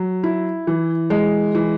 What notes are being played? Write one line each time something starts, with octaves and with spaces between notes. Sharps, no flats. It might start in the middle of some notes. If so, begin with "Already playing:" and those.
Already playing: F#3
E4
E3
G#3
E3